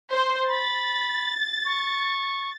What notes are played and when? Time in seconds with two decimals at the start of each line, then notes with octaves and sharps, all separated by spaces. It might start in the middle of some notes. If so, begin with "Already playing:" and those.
0.13 C5
0.48 B5 A6
1.65 C#6